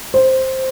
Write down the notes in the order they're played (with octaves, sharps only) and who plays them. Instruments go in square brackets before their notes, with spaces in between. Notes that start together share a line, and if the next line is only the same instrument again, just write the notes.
[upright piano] C5